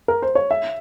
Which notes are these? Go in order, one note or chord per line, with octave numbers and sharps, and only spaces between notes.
A#4
C5
C#5
E5